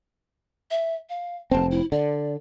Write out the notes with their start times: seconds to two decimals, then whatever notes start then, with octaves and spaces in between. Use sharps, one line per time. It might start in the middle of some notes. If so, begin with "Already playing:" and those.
0.71 E5
1.09 F5
1.51 F1 C4 A5
1.71 E4
1.92 D3 D5